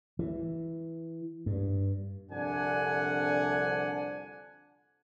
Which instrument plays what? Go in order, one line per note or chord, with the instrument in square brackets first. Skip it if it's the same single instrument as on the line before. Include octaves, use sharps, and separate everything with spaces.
[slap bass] E3
G2
[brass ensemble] C2 F2 D3 D4 F#5 G#5